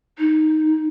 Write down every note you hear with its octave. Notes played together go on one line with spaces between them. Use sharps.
D#4